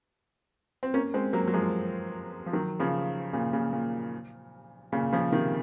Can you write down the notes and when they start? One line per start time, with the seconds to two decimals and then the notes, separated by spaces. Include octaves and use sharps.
0.83 C4
0.94 A#3 C#4
1.14 G#3 C4
1.33 F#3 A#3
1.47 F#3
1.54 F3 G#3
2.46 F3
2.53 D#3 F#3
2.80 C#3 F3
3.33 A#2 C#3
3.53 A#2 C#3
3.73 A#2
4.92 A#2 C#3
5.12 C#3 F3
5.32 C3 D#3